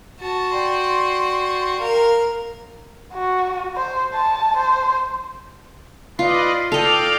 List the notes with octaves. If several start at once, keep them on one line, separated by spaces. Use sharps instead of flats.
F#4 A5
D5 G5 C6
A#4 F5
F#4
C5
A5
C5
F4 B4 D5 D#5 C7
A4 D5 D#5 F5 G5 F7